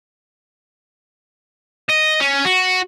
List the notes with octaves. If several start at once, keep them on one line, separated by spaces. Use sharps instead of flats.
D#5
C#4
F#4